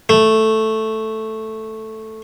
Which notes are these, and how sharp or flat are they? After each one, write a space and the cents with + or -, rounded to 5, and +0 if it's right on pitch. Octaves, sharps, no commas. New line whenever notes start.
A3 +0